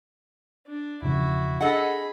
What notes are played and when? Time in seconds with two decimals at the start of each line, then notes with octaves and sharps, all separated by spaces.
0.67 D4
1.02 E1 C#3 F3 E4 F#4
1.61 D4 G#4 A4 D#5 F#5 B5